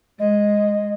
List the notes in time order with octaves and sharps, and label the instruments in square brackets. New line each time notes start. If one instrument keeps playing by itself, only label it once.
[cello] G#3 [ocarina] D#5